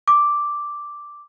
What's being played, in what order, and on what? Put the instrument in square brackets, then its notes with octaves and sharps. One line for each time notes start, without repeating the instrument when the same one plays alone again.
[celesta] D6